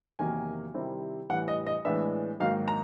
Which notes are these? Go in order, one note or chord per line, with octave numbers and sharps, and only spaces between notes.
E2 C3 D#3 F#3 A#3 G#5
C3 D#3 G3 C4 E4
A2 E3 G3 F#5
D#5
D#5
A2 E3 G#3 B3 D4 E5
G#2 D#3 F#3 A#3 D#4 F5
A#5